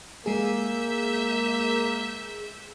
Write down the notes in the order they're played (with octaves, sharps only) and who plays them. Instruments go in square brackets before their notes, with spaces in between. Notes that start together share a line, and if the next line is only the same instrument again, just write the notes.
[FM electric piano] G#3 G#4 [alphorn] A#3 [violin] E5 G6